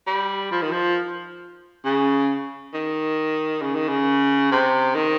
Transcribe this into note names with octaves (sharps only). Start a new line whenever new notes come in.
G3
F3
D#3
F3
C#3
D#3
C#3
D#3
C#3
C3
D#3